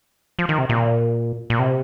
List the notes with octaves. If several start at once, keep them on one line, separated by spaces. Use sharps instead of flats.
F3
D#3
C3
A#2
A#2
C3